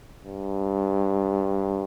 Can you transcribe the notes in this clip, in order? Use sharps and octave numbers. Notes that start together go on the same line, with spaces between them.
G2